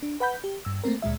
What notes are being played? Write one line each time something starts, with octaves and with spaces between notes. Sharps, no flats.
D4
B4 F#5 B5 G6
G4
G2 E6
A3 A#3 C4 A#4
D2 A#2 G#3 E5